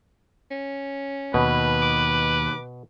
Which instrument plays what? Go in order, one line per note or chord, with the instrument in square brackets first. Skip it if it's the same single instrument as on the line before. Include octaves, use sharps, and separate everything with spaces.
[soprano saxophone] C#4
[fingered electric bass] D#2 [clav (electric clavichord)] B2 [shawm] B4
[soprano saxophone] D6